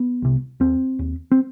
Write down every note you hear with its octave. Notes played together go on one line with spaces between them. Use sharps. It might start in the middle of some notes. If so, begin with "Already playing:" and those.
Already playing: B3
C2 C3
D#2 C4
D#2
C4